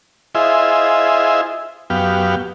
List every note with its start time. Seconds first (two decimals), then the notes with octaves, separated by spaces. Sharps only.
0.35 E4 F4 G#4 C5 D#5 E5
1.90 F#2 B3 G4 F5